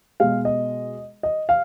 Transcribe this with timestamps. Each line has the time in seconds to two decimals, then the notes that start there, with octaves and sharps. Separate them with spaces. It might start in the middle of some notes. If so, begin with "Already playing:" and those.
0.20 B2 G#3 F5
0.45 D#5
1.23 D#5
1.49 F5